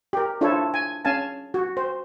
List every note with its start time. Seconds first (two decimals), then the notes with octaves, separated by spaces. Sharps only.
0.13 G4 A#4
0.41 D4 E4 F4 A4 C5 C#5
0.74 G#5
1.05 C#4 F5 G#5 A5
1.54 F#4
1.77 C5